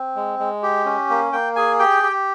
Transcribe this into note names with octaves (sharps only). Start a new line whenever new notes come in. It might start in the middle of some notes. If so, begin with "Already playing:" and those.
Already playing: C4
G#3
G#3
G4
C#4
A#3
A#3 G5
G#4 G#5
G4 G5
G4